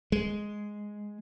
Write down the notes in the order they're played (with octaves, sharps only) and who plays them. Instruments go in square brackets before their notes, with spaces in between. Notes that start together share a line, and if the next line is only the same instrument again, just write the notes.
[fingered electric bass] G#3